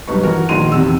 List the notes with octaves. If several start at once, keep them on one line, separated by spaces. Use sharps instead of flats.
B1 G2 D#4 B4 C#6
E3 F#4 A#4
A#1 D#3 D#4 F#4 C6 D#7
E2 C3 E6